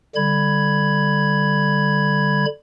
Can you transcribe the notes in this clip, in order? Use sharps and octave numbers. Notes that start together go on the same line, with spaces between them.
D3 G3 B5 G#6